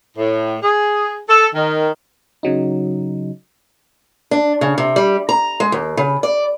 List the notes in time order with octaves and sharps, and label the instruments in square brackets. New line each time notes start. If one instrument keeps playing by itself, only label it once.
[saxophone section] A2
G#4
A4
D#3
[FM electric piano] C#3 F#3 D#4
[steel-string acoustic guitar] D4
C#3
C3
G3
A#5
G#3
D#2
C#3
D5